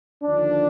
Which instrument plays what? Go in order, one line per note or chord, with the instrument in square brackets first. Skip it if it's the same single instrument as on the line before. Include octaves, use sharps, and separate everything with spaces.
[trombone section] D#2 D3 F3 D4